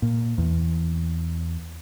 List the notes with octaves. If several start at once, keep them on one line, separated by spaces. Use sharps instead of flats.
A#2
E2